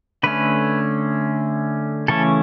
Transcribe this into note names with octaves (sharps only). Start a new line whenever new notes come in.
D3 A3 C#4 B4
C#3 E3 A3 C#4 A4